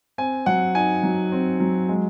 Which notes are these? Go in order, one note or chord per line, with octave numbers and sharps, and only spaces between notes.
C4 G#5
F#3 F#5
D#4 G#5
F#3
C4
F#3
G#3